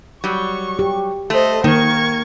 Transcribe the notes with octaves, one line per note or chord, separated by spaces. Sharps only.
F#3 G3 C#6
G4
A3 A4 C5 D#5
D#3 A#3 A#4 C#6 G#6